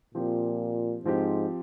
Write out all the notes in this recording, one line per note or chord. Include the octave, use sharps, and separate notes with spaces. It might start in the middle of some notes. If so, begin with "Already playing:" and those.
A#2 F3 C4 G4
G#2 F3 C4 G4